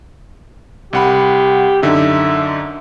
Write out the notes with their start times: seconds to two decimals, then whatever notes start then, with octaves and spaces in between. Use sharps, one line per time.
0.93 C2 G4 F#5 B5
1.83 F#2 D3 D#4 E5